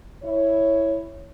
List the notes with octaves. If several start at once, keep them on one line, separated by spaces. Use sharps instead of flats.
E4 C#5